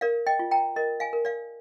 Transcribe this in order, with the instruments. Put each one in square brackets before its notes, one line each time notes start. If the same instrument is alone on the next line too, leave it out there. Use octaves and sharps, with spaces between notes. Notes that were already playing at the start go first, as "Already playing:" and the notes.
[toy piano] A#4 D5 F5
D#5 G5
F4
G5 A#5
A#4 D#5
F5 G#5
A#4
D5 F5